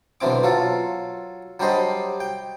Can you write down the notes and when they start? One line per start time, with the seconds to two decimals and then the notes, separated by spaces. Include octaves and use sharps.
0.21 B1 D3 E3 C4 D6
0.43 F#3 F4 A4
1.60 F#3 G3 D4 G4 C5 D#5
2.20 G5